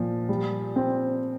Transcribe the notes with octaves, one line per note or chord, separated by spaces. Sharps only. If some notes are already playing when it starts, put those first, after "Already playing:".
Already playing: A#2 F3
G3
C4